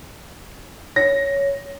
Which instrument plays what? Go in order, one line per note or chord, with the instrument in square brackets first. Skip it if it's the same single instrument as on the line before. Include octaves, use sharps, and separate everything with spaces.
[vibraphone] C#5 [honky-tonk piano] A#6